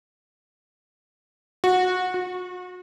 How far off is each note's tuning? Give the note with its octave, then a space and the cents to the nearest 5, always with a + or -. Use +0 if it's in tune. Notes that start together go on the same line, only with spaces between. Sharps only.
F#4 -15
F#4 -35